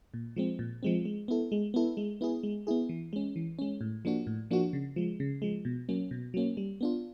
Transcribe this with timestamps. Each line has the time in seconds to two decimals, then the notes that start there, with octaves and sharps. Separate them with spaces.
0.14 A#2
0.36 F3 G#3 C4
0.59 A#2
0.83 F3 G#3 C4
1.05 G#3
1.28 B3 E4 A4
1.52 G#3
1.74 B3 E4 A4
1.97 G#3
2.21 B3 E4 G#4
2.43 G#3
2.67 B3 E4 G#4
2.89 E3
3.13 G#3 C#4
3.36 E3
3.59 G#3 C#4
3.81 A2
4.05 F3 A#3 D4 F#4
4.27 A2
4.51 F3 A#3 D4 F#4
4.73 C#3
4.96 F3 G#3
5.20 C#3
5.42 F3 G#3
5.65 B2
5.89 F#3 A#3 C#4
6.11 B2
6.34 F#3 A#3 C#4
6.57 G3
6.81 B3 D4 F4